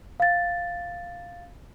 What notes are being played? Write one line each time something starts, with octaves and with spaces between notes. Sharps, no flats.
F5 A6